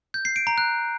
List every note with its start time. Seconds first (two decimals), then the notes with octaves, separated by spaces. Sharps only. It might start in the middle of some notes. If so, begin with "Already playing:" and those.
0.14 G6
0.25 C7
0.36 D7
0.47 A#5
0.58 F#6